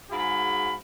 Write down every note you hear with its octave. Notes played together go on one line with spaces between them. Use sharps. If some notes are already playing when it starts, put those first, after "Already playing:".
G#2 F#4 G#4 F5 B5